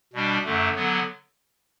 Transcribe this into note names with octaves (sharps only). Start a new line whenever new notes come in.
B2 G3 D4
F#2 D3 A3
D3 F#3 B3